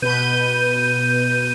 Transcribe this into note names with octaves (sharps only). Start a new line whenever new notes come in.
B2 B4 G6 D#7